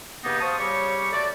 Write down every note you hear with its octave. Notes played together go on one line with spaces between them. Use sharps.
G2 C#3 A#3 B3 D#4
C5 F5 A5 C#6 D#6
C#3 G3 G4 C#5 C#6
A3 F#4 A4 D5